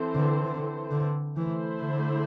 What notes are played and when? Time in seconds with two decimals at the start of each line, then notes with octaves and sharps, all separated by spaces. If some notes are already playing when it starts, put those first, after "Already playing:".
Already playing: E3 C4 A4 C5
0.15 D3
0.45 D3
0.91 D3
1.36 E3 A3 E4 C5
1.83 D3